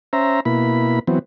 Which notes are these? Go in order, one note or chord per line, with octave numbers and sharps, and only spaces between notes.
C#4 C5 E5 A#5
B2 A#3 E4 B5
E3 F#3 B3 C4